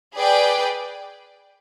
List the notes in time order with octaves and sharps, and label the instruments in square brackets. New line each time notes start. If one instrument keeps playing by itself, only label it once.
[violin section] G#4 B4 D5 G5